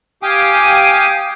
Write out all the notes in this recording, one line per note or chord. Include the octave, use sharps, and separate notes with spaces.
G4 F5 G5 G#5 D6 D#6